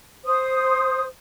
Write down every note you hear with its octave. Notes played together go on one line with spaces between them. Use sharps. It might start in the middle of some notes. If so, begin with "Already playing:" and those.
C5 D#6